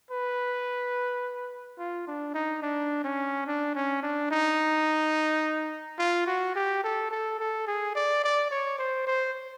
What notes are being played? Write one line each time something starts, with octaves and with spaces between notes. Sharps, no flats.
B4
F4
D4
D#4
D4
C#4
D4
C#4
D4
D#4
F4
F#4
G4
A4
A4
A4
G#4
D5
D5
C#5
C5
C5